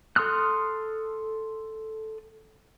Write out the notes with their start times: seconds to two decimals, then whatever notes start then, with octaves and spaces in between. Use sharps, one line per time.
0.16 A4 C6 D#6 F6 F#6